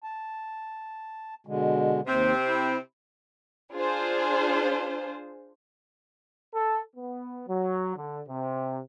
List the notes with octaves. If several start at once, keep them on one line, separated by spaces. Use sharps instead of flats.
A5
B2 D3 G#3
D#2 C3 C4 C5
E4
D4 F4 G#4 C5
A4
B3
F#3
D3
C3